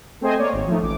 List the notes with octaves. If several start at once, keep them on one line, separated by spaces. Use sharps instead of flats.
A3 C4 G#4 C5 D#5 G#5
A#3 C#5 D5
G#1
F3 A3 D#4
A1 D6